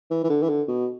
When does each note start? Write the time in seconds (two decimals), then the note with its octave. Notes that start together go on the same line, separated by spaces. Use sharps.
0.10 E3
0.24 E3
0.30 D3
0.43 E3
0.49 D3
0.68 B2